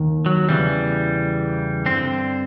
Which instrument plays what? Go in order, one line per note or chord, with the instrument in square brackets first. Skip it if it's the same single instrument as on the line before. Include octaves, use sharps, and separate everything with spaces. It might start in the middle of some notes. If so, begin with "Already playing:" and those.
Already playing: [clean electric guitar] D#2 D#3
F#3
E2 C#3 E3 G3
G2 D3 C4